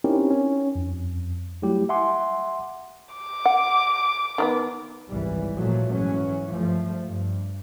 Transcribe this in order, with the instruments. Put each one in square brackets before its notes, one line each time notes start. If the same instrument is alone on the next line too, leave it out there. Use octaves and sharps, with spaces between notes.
[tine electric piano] C4 C#4 D#4 E4 G4 A#4
C#4
F2
F#3 G3 A3 E4 G4
E5 F#5 G#5 C6 D6
[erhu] D6
[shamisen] F#5
D#3 F#3 B3
[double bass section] G#1 C#2 E3 G3
A#2 F3 F#3 A3 A#3
G#2 E3 F#3 C#4
G2 F3 A3
G2